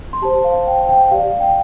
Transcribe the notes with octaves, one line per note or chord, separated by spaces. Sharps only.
C6
G4 C5 A5
F5
G5
G5
G4 D5 F5
G5